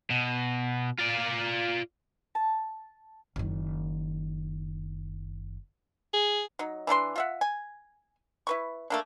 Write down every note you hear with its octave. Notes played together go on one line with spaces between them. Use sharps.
B2
F4 D5
A5
F#1 D#3
G#4
F#3 D#4
E3 D4 A#4 C6
F4 E5 F#5
G#5
E4 B4 C#6
A3 A#3 D4